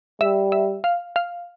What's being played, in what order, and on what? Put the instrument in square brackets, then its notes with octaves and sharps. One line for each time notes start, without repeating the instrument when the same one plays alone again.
[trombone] G3 [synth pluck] E5
[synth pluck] E5
F5
F5